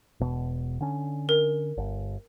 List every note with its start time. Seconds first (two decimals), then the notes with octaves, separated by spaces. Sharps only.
0.20 E1 B2
0.81 D3 C#4
1.29 A#4
1.77 G1